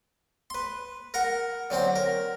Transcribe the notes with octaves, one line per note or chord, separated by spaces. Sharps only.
B4 C6
A#4 F#5
D3 F#3 C4 C5
A#4